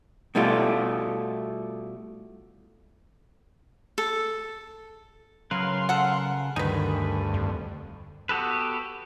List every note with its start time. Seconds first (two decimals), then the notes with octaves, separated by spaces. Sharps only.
0.35 B2 G3 A3 E4 F4
3.98 A4
5.51 C#3 F#3 A#4 B4 F5 C6
5.89 A4 F#5
6.56 D2 G2 D#3 D#4 B4 G#5 B5
7.34 F2
8.29 B3 F#4 G4 A4 B4